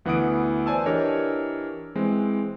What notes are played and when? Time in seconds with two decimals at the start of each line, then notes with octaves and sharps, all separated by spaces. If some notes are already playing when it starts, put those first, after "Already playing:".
0.05 D2 E3 B3 F#5 D#6 D7
0.66 B4 C5 D5 G#5 A5 E6
0.86 E3 D4 G4 A#4 C#5 D#5
1.95 E3 G#3 C4